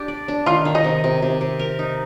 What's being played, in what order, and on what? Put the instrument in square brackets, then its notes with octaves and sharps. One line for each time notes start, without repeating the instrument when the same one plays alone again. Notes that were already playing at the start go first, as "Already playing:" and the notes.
Already playing: [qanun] D4 G4
D5
D4
[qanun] D#3 [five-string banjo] F4 F5
[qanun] D#3
[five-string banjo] D#4 D#5
[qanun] C3
C3
C3
C3
A#4
D#4